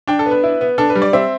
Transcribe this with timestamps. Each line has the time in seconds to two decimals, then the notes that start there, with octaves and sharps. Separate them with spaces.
0.07 D4 G5
0.19 A4
0.26 B3
0.31 B4
0.43 E4
0.61 B3
0.78 D4 A4
0.90 B4
0.95 G3
1.02 D5
1.13 C4 E5